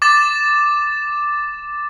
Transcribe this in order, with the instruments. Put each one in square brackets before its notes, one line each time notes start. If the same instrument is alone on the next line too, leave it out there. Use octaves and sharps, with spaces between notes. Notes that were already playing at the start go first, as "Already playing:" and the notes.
[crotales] D6 A6 E7